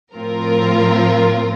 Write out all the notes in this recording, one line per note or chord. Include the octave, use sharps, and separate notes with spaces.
A2 F3 C4 F4 A#4